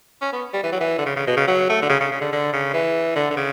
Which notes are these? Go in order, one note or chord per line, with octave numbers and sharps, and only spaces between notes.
C#4
B3
G3
E3
F#3
E3
D3
C#3
C#3
B2
C#3
F#3
A3
D3
C#3
C#3
C#3
D3
D3
C#3
E3
D3
D3
C#3